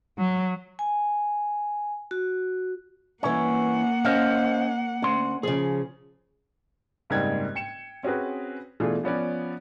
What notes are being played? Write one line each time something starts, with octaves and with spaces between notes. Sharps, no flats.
F#3
G#5
F#4
G2 E3 A#3 C#4 F#5
C#4 C5 D#5 F5
D2 C#4 C6
C#3 F3 G#4
F#1 G#2 G3 C4 D#4 G#6
G5 C#7 E7
C4 C#4 F#4 G#4 B4
B2 E3 A3 D4 F4 G#4
F3 B3 C#4 D5